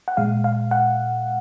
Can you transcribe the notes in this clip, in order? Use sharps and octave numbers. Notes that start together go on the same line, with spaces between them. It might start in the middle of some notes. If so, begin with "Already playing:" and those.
F#5
A#2 G#3 F5
F5
F#5